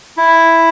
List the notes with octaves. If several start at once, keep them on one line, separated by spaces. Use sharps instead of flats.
E4